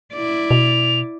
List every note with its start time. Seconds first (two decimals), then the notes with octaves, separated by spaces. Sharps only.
0.14 E4 D5
0.51 B2 F7